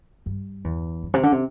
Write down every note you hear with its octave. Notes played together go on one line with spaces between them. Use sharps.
G2
E2
G2
C3
D3
C3